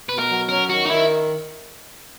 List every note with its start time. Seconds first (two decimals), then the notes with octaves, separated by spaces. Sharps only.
0.09 B2 B4
0.19 A#4
0.29 F#3
0.49 C#4 A#4
0.70 D#3 F#4
0.85 D#4
0.90 D#3 E4